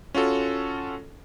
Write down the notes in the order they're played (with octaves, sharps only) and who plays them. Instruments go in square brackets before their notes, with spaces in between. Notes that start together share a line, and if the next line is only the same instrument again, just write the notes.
[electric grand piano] C#4 F4 F#4 A4